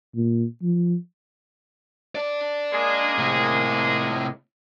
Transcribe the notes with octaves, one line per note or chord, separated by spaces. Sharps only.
A#2
F3
D4 D5
G#3 A#3 G#4
A2 C3